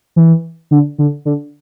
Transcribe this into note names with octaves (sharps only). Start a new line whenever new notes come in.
E3
D3
D3
D3